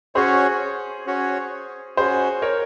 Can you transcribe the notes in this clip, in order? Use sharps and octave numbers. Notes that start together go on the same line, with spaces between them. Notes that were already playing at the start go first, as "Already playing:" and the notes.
C#4 F#4 G#4 C5 C#5
C#4 F#4 C#5
C#4 F#4 G#4 C5 C#5
A#4 C#5